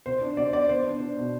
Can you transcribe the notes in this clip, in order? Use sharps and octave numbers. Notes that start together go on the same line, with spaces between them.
C3 C5
D4
C3 D5
B3 D5
B3 C5
D4
D4
B2